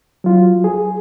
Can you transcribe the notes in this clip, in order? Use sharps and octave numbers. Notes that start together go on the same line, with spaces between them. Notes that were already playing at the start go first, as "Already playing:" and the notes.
F#3 F4
G#4